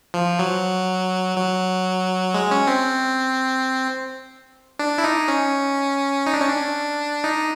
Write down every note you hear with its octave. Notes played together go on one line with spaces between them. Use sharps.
F3
F#3
F#3
G#3
C#4
C4
D4
E4
D#4
C#4
D#4
D4
C#4
D4
D#4